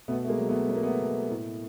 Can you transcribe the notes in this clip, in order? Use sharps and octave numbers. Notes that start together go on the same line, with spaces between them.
B2 A3 B3
A3
G#3 A#3
F#3
A3 B3
F#3 B3
A#3
A3 B3
B2
A2